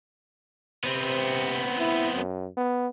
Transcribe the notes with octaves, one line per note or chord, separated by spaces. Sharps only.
C3 B3 C4
E4
F#2
B3